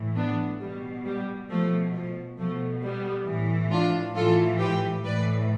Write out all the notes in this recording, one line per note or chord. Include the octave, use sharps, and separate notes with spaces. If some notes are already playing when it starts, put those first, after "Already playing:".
Already playing: A2 E3
B3 D4
B2 G3
G3
B2 F3 A3
F3
B2 F3 A3
G3 B3
A2 E3
D4 F4
A2 E3 F4 A4
G4 B4
A2 E3 B4 D5